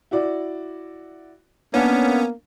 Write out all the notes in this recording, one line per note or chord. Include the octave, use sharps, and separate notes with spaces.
E4 F#4 D5
A#3 B3 C#4 D4